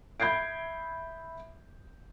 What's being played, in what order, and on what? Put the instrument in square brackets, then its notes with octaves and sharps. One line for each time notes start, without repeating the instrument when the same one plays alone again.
[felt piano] E5 B5 G6 G#6 C7 D7